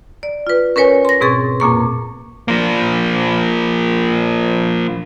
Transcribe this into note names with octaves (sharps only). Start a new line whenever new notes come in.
D5
F4 B4
C#4 A#4 B4 C#5 G#5
C6 A#6
G#2 B2 C4 G#4 C#6 A6
F2 A#2 A#3 C#6
F3 A#3